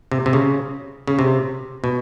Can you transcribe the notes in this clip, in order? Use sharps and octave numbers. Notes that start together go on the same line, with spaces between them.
C3
C3
C#3
C#3
C3
B2